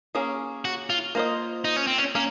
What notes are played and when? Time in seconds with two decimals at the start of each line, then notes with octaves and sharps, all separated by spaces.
0.15 A#3 C#4 G#4
0.65 F#4
0.90 F4
1.15 A#3 F4 C5 D#5
1.65 D#4
1.76 C#4
1.87 C4
1.98 C#4
2.15 A#3 C#4